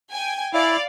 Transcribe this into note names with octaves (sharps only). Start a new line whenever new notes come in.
G5 G#5
E4 D5 F5